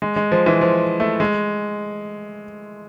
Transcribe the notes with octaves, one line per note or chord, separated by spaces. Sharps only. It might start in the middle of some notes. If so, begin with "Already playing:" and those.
G#3
G#3
F3
E3
F3
A3
G#3